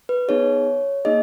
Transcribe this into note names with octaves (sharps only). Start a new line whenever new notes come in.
B4
B3 D#4 G#4 C#5
A#3 D#4 G#4 D#5